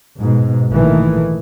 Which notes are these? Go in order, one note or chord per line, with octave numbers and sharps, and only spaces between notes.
G#2 B2
A#1 D#3 E3 A3